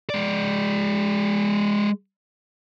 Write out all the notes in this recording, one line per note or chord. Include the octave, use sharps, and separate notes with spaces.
G#3 D5